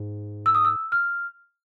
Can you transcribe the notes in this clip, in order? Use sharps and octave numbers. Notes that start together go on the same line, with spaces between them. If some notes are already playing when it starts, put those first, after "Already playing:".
Already playing: G#2
E6
D#6
E6
F6